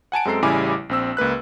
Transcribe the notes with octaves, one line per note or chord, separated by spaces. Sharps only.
F#5 G#5 A5 D7
F#2 G#3 C4 A4 A#5 C7
A1 C#3 G3 E4 G#5 D6
A#1 C4 E6
C#2 A#3 B4 F#6